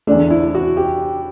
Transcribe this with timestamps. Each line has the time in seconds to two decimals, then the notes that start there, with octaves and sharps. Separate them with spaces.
0.07 E2 D3 A3 D4
0.30 E4
0.55 F#4
0.77 G4